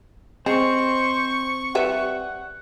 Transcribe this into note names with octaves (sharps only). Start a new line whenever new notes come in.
G#3 C4 C5 C#6
G3 B4 E5 F#5